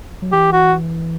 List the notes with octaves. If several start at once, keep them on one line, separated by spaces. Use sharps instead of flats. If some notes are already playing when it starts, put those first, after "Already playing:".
F#3
E3 G4
F#4